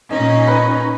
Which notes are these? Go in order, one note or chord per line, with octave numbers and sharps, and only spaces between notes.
A#2 C#4 D#4 D#5
B4